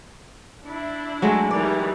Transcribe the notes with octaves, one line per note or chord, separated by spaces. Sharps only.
D4 E4
F#3 G#3 A3
D#3 E3 G3 D5